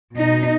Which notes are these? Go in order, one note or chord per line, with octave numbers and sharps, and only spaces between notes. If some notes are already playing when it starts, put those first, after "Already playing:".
B2 D#4